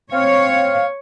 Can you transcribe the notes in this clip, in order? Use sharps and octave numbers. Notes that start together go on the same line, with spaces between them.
C4 C#5 F5